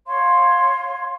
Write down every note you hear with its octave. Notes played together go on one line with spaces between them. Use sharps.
C#5 F5 C6